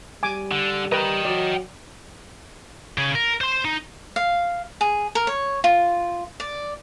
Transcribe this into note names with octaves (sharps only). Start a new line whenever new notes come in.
G3 G#5 D6
D3
A#4 B4 D#5 G5 A#5
F#3 D5
C#3 G#4
A#4
C5 C6
D#4
F5
G#4
A#4
C#5
F4
D5